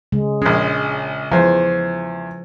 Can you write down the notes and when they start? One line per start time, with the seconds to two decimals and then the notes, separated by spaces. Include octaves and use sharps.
0.12 C#3 G#3
0.42 A#1 G#3 C#4
1.32 E2 F3 C5